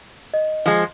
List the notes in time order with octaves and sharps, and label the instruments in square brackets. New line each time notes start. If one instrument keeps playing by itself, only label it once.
[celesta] D#5
[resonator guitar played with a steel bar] F3 G#3